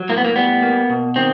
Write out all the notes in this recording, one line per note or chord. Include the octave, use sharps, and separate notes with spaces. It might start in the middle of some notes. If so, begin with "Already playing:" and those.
Already playing: F#3
A2 A#3
B3
A#3
G3 B3
A#3
B2
D#3 C4